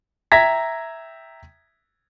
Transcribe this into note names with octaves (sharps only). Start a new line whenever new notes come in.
E5 G5 A#5 G#6 A#6 B6